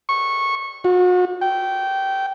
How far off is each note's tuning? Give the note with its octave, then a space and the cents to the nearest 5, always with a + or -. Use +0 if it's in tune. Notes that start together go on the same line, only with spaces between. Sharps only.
C#6 -15
F#4 -40
G5 -15